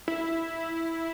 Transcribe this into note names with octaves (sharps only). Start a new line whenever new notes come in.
E4